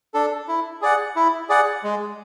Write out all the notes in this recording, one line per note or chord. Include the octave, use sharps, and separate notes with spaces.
D4 A4
E4
G#4 D5 F#5
E4
G#4 D5 F#5
G#3